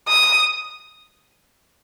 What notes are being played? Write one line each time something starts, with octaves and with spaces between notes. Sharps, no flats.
D#6